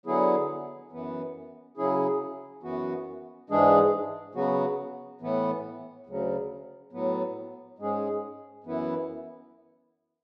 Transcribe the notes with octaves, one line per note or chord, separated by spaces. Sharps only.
D3 F#3 B3 E4 G#4
F#2 E3 B3
C#3 F#3 C#4 E4 G#4
F#2 E3 B3 F#4
G#2 E3 G#3 D4 G#4
C#3 F#3 B3 F#4
A2 E3 B3
D2 C#3 F#3
A2 F#3 B3
G#2 G#3 C#4 G#4
F#2 E3 B3 E4